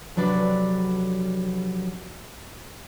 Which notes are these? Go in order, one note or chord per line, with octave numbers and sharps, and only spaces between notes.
F2 C3 F#3 D4 B4 D5